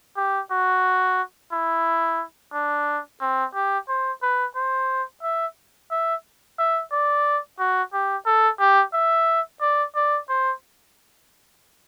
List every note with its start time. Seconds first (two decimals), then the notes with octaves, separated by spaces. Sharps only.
0.17 G4
0.51 F#4
1.53 E4
2.53 D4
3.21 C4
3.55 G4
3.89 C5
4.22 B4
4.56 C5
5.23 E5
5.91 E5
6.59 E5
6.92 D5
7.59 F#4
7.93 G4
8.26 A4
8.60 G4
8.94 E5
9.61 D5
9.96 D5
10.29 C5